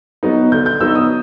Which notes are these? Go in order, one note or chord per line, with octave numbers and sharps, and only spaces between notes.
F#3 B3 D#4
D3 G6
G6
F#3 B3 D#4 E6
D#6